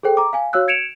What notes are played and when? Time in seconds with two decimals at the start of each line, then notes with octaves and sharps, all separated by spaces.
0.03 G#4 A4 C5 G5
0.17 A#5 D6
0.33 F5 G#5
0.53 F#4 C#5 F5 E6 F#6
0.68 G#6 C#7 D7 E7 F7